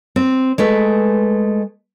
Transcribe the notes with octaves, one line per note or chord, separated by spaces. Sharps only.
C4
G#3 A3 B4